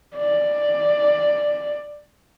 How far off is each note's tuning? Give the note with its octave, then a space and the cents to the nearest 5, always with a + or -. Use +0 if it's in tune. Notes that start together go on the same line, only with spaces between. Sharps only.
D5 +10